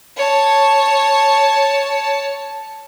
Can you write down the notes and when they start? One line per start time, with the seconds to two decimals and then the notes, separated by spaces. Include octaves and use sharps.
0.17 C#5 A5